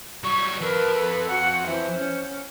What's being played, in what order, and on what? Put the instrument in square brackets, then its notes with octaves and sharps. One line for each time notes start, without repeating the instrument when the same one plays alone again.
[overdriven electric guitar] F#3 G3 [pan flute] C#6
[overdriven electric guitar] F2 [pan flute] A#4 [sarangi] B4
[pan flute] A4
[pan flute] F#4 [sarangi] F#5
[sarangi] E3 [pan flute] C5
[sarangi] C#4